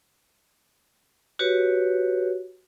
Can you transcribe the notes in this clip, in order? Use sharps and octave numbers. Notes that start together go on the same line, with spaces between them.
F#4 G4 B4 C#5